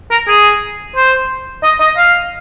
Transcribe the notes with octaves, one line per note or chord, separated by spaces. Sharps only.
A#4
G#4
C5
D#5
D#5
F5